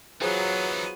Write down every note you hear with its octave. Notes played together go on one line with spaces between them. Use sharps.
E3 F#3 B3 D#4 F4 G#4 C5